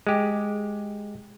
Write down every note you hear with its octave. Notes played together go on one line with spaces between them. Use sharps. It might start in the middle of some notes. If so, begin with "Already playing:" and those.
G#3 G4